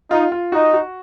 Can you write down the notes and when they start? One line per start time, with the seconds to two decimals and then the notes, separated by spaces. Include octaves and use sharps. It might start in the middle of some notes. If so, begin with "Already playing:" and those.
0.10 D#4 F4
0.32 F4
0.52 D#4 F#4
0.73 F#4